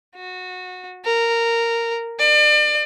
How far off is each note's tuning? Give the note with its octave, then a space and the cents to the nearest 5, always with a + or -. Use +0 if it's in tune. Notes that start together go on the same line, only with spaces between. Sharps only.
F#4 -20
A#4 -10
D5 +35